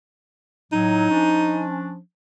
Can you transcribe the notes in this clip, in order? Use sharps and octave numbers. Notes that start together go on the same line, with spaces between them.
A2 F#3 D#4
F3 C#4 D4